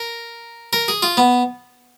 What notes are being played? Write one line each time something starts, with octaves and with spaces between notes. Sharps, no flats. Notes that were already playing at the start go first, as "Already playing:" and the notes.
Already playing: A#4
A#4
G#4
F4
B3